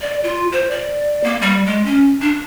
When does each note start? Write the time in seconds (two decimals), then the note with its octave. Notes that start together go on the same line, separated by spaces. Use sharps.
0.01 D5
0.24 F4
0.52 C5
0.71 D5
1.24 A#3
1.42 G3
1.66 G#3
1.85 C#4
2.21 D4